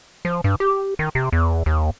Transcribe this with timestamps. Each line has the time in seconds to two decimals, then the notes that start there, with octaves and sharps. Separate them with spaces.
0.25 F3
0.44 G2
0.60 G4
0.99 D#3
1.15 C3
1.33 E2
1.66 D#2